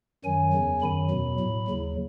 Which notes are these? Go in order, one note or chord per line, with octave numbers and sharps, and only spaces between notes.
F#2 D#3 F#3 G#5
E2 C#3 F#3
F#2 D#3 F#3 B5
E2 B2 F#3
A2 F#3
D#2 C#3 F#3